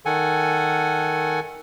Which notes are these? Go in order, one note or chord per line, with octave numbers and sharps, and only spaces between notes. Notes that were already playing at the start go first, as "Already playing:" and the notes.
D#3 A4 F#5 G#5